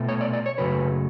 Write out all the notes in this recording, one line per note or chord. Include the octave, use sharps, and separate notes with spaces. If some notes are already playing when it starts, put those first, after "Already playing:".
Already playing: B2 A3
C#5
D5
D5
C#5
F#2 C#3 F#3 A3 B4